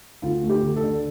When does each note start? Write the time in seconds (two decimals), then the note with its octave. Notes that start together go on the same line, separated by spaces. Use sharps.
0.22 D2 F4
0.43 A3
0.49 G4
0.62 D2
0.76 A4
0.83 D3